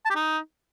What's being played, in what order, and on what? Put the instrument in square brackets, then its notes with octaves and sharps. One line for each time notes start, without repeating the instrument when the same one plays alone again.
[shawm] A5
G4
D#4